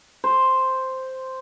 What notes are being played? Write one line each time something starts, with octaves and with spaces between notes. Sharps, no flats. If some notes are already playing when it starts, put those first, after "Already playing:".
C5